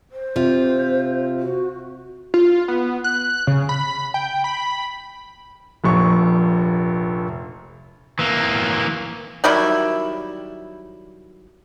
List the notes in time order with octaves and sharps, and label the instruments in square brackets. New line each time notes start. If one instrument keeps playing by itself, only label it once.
[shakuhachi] C5
[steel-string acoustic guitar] C3 F4
[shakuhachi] F#4
[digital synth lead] F4
B3
F#6
C#3
B5
G5
B5
[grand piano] F1 A#1 C#6
[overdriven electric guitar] E3 A#3
[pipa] D#3 F#3 G3 E4